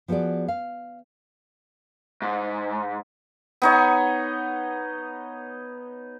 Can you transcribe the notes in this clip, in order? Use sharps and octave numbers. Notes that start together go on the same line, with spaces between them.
F3 B3 F#4 G#4 D5
F5
G#2
B3 D#4 C#5